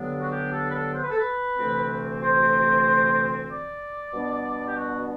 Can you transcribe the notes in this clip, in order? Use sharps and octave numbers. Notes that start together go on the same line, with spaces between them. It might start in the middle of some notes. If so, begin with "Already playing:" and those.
Already playing: G2 D3 F#3 B3 D4
F#4
G4
A4
B4
A4
C5
B4
A4
B4
D2 C3 E3 A3 C4
C5
D5
B2 G3 B3 D4
G4
F#4